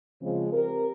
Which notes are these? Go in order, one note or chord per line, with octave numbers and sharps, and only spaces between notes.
C#3 F3 G#3 C4
C4 G4 A#4